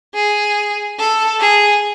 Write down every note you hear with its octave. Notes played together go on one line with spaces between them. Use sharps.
G#4
A4
G#4